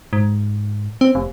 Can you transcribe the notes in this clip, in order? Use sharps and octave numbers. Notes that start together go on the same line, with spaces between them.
G#2
C4
F1